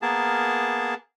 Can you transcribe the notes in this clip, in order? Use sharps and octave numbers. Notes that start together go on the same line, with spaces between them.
A#3 B3 G#4 A#4 A5